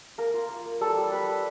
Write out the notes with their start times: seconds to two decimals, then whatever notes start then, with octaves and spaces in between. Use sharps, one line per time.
0.18 A#3 A#4
0.34 F4
0.49 A#3
0.66 A#3
0.81 G3 A4
0.97 G3
1.12 G3 B4
1.28 G3